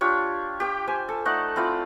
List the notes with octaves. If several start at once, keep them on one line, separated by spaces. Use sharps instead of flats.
D4 F4 G4 C#5
G4 G5 D6
C5 G#5
A4
A3 D#4 D5 F#5
C4 E4 F4 D5